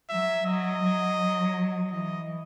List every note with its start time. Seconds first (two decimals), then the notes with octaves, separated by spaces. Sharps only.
0.10 F#3 E5
0.46 F#3 D#5
0.83 F#3
1.91 E3 D#5